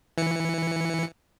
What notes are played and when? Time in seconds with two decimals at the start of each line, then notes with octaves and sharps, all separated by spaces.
0.18 E3 C#7